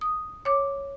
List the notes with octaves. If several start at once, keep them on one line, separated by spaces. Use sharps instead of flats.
D#6
C#5 D6